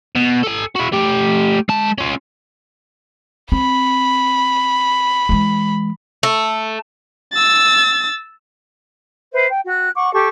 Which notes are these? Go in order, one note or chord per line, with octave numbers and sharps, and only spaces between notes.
B2
A4 G#5
E4 F#4
A3 G4
G#3 A5
C#4 F4
C4 B5
E3 G#3
A3
E6 A6
B4 C5 E5
G5
F#4 G5 F#6
F#5 C#6 D6
G4 A4 C#6 D6